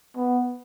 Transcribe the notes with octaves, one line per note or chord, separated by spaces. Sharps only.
B3